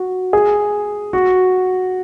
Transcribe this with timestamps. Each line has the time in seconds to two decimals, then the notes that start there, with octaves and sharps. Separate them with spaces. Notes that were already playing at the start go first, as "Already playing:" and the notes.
Already playing: F#4
0.33 G#4
1.13 F#4